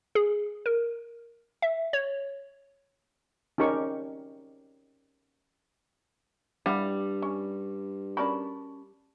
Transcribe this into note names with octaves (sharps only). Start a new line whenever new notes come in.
G#4
A#4
E5
C#5
C#4 D#4 G4 A#4 C#6
G2 G3 D4 E4 F5 F#5
C#4
C#4 F#4 A#4 D5 A5 B5